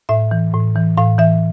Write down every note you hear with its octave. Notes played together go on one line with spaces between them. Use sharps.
A2 E5
E3
A2
E3
A2 F5
E3 E5